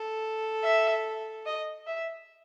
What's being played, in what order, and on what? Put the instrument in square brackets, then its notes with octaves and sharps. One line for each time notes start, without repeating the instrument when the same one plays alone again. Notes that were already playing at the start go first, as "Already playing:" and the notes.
Already playing: [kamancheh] A4
[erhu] E5
D#5
E5